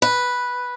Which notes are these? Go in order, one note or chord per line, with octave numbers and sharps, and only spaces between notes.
B4